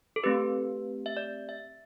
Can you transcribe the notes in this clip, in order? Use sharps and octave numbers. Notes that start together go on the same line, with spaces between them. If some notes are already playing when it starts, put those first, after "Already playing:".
A4
A3 C4 G4 B4
E5
D5
E5